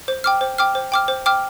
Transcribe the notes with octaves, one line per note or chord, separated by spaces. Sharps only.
C5
G5 D6 F6
C5
G5 D6 F6
C5
G5 D6 F6
C5
G5 D6 F6